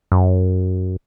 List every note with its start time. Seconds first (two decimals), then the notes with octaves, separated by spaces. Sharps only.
0.12 F#2